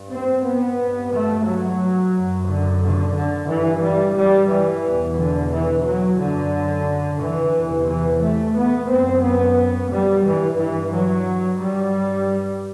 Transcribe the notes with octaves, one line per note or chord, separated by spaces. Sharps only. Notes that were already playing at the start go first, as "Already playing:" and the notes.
Already playing: G2
C4
B3
G2
A3
F#3
F#2
D3
D3
D3
G2 E3
G3
G3
E3
E2 B2
D3
E3
F#3
F#2 D3
E3
E2 C3
E3
A3
B3
F#2 C4
B3
G3
G2 E3
E3
F#3
G2 G3